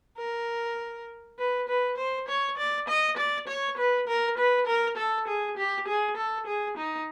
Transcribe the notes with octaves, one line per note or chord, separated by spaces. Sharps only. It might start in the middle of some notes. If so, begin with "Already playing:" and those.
A#4
B4
B4
C5
C#5
D5
D#5
D5
C#5
B4
A#4
B4
A#4
A4
G#4
G4
G#4
A4
G#4
D#4